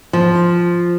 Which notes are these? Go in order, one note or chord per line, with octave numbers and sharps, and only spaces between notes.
F3